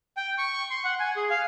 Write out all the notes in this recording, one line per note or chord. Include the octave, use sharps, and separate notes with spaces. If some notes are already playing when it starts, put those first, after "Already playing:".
G5
C#6
C6
F#5
G#5
G#4
F5